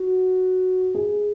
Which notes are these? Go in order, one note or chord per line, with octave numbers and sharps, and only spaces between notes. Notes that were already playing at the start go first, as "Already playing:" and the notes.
Already playing: F#4
G#4